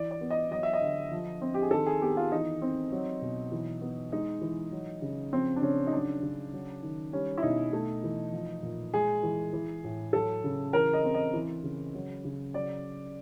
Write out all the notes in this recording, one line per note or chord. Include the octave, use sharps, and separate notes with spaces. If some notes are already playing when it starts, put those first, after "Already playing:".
Already playing: E3 D5
D5
B3
D#5
F#3 D#5
E5
D#5
D3
F3
C4
G4
G#4
D#3 A4
G#4
B3 G4
F4
E3 D#4
C4
F#3
B2
E3
B3
G#3 D#4
E3
F#3
C#3
F3 C4
D4
C#3 C#4
D#4
F#3 D4
C#3
F#3
D#3
G3 C#4
E4
B2 D#4
A3
E3
F3
A#2
G#3 G#4
E3
E3
A2
F#3 A4
C#3
E3 A#4
D#5
C4
D#5
E3
C#3
F#3
C#3
F#3 D5